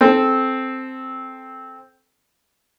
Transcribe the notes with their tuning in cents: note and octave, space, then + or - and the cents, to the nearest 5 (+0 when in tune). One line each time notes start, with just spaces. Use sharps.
C4 +0 A4 -20